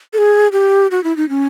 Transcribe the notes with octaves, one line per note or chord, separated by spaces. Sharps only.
A4
G#4
G4
F#4
E4
D#4
C#4